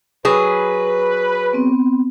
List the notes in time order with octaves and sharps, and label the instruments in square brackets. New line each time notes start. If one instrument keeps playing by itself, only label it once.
[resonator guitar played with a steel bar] F#3 G#4 [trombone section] B4
[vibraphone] B3 C4